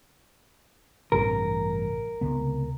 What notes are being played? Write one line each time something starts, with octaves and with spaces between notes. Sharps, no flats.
A1 G2 C3 A#4
C#2 C3 B3